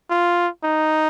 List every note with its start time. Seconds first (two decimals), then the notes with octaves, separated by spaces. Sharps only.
0.10 F4
0.64 D#4